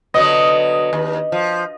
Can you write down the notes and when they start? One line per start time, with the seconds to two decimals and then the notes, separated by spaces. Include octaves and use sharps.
0.14 D3 F#3 B3 D#5
0.93 D#2
1.32 F3